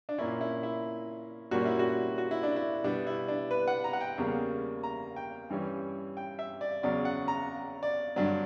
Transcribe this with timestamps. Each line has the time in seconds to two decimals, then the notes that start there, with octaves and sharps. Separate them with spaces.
0.09 D4
0.18 A#2 A#3 C#4 E4
0.41 E4
0.63 E4
1.51 A#2 G3 A#3 C#4 F#4
1.65 E4
1.79 F#4
2.18 F#4
2.31 E4
2.43 D4
2.56 E4
2.84 B2 G3 B3 D4
3.07 E4
3.28 D4
3.51 B4
3.68 F#5
3.84 A#5
3.93 F#5
4.01 G5
4.18 E2 C#3 G3 A#3
4.83 A#5
5.16 G5
5.50 G2 E3 G3 C#4
6.17 G5
6.39 E5
6.61 D5
6.83 E2 C#3 F#3 C#4 D5
7.05 F#5
7.28 A#5
7.83 D5
8.16 G2 D3 F#3 D5